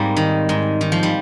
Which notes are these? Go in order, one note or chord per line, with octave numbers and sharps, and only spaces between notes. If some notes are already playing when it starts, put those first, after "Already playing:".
Already playing: G#2 G3 A#3 C4
D#3
G#2
D#3
F3
G3